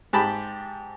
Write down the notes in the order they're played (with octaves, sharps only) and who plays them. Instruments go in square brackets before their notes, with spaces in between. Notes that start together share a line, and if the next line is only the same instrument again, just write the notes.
[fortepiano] G#2 G4 A5 B5